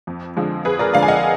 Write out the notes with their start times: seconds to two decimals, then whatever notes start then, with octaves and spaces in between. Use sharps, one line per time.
0.07 F2
0.37 D3 F3 G#3
0.65 F2 G#4 B4
0.79 A#4 D5
0.94 D3 F3 G#3 D5 F5
1.03 G#5
1.08 D#5 F#5